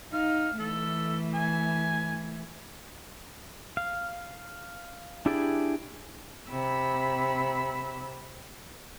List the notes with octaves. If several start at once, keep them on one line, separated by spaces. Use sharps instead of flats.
D#4 F5
E3 A3 A4
G#5
F5
D4 E4 G4 G#4 D5
C3 B5 E6